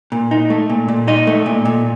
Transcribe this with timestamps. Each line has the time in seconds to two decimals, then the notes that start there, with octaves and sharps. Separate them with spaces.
0.12 A#2
0.31 D#4
0.50 A3
0.70 A#2
0.88 A#2
1.08 D#4 D#5
1.27 A3
1.46 A#2
1.65 A#2